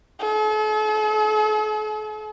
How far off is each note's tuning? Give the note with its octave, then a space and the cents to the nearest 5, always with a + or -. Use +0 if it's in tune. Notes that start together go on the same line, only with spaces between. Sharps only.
A4 -45